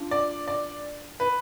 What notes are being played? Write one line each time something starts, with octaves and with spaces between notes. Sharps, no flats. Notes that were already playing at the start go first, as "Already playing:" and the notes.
Already playing: D4 F4
D5
D5
B4